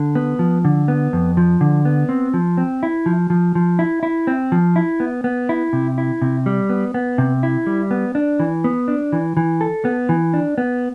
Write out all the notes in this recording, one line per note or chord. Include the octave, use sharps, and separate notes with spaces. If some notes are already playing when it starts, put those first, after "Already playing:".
Already playing: D3
B3
F3
D3
B3
F2
F3
D3
B3
C4
F3
C4
E4
F3
F3
F3
E4
E4
C4
F3
E4
B3
B3
E4
C3
E4
C3
G3
B3
B3
C3
E4
G3
B3
D4
E3
B3
D4
E3
E3
A4
B3
E3
D4
B3